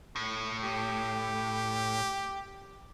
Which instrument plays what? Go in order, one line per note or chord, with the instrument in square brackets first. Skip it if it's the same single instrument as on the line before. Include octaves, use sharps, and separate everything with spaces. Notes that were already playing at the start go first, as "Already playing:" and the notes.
[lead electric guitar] A2
[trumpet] G4